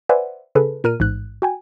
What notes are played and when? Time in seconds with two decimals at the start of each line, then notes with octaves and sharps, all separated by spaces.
0.09 B4 C5 D5 E5 F#5 G#5
0.55 C#3 G#4 A4 B4
0.84 A#2 A#4 F6 D#7
1.00 A1 G#2 F#6
1.42 F#4 G5 G#5